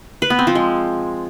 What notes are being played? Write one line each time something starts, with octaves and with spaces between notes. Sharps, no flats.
B4
B3
C4
F3
G#3